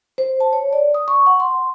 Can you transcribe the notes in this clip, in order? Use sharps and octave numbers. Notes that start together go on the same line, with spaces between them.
C5
A5
C#5
D5
D#6
C#6
F#5
C6